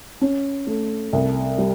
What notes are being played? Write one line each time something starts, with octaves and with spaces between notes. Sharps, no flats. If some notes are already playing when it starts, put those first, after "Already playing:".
C#4
A3
C2
G3